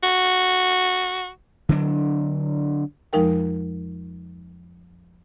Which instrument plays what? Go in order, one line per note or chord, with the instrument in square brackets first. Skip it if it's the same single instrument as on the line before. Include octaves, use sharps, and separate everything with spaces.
[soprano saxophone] F#4
[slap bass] D3 F#3 D4
[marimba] F2 F3 G#3 D#4 A#4 G5